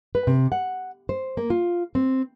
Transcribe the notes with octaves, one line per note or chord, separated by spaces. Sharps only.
B4
C3
F#5
C5
A#3
F4
C4